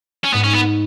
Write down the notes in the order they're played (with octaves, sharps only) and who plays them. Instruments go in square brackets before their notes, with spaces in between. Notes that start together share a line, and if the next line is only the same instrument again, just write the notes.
[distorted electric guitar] C#4
[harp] G#2 [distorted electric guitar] B3
[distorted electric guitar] C#4
B3